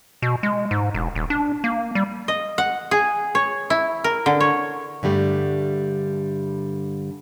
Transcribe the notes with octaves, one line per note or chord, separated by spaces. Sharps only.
B2
G#3
G#2
E1
D#1
D4
A#3
G3
D#5
F#5
G#4
C#5
E4
A#4
D3
C#5
G2 D3 G3 A3